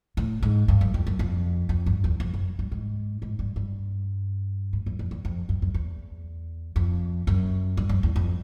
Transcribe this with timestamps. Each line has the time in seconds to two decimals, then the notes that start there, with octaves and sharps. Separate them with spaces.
0.17 A2
0.42 G#2
0.68 G2
0.81 F#2
0.94 F2
1.07 F#2
1.19 F2
1.69 F2
1.86 G2
2.04 E2
2.20 F2
2.34 F#2
2.59 G2
2.72 G#2
3.22 G#2
3.39 G2
3.56 G2
4.73 G#2
4.86 F#2
4.99 F2
5.11 E2
5.25 F2
5.49 F#2
5.62 F#2
5.74 E2
6.76 F2
7.27 F#2
7.77 G2
7.89 F#2
8.03 E2
8.16 F2